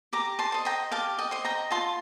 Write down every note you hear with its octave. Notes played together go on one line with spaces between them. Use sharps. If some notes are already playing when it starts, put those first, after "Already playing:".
G4 A#5 D6
A5 C6
C5 D#5
G5 A#5
G4 F5 A5
D#5 G5
C5 D#5
G5 A#5
F4 A5 C6